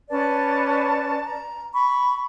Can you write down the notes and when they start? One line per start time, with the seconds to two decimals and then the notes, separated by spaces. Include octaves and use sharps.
0.11 C#4 B4 D5 A5
1.24 A#5
1.73 B5 C#6